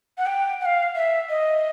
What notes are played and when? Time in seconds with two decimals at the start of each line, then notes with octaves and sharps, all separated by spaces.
0.18 F#5
0.26 G5
0.61 F#5
0.66 F5
0.95 E5
1.29 D#5